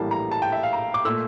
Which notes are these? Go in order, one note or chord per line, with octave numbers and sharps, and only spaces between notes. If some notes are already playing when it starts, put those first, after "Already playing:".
Already playing: A#1 A2 E3 G3 A#3 A5
A#5
A5
G5
E5
F5
A#5
D6
A#2 A3 E6